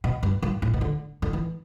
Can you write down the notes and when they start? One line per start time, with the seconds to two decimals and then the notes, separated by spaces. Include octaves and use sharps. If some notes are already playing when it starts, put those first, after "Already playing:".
0.04 B2
0.23 G2
0.42 G2
0.62 A2
0.73 B2
0.81 D3
1.22 D3
1.33 E3